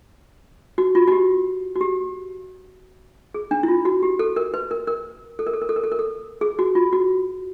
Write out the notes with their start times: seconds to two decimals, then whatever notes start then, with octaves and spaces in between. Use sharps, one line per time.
0.78 F#4
0.95 F4
1.08 F#4
1.12 G4
1.76 F#4
1.81 G4
3.34 G#4
3.51 D4
3.63 E4
3.68 F4
3.85 F#4
4.03 G4
4.19 A4
4.36 A#4
4.54 B4
4.71 A#4
4.87 A#4
5.39 A4
5.47 A#4
5.54 A4
5.62 A#4
5.69 A4
5.76 A#4
5.84 A4
5.92 A#4
5.99 A4
6.41 G#4
6.59 F#4
6.75 F4
6.92 F#4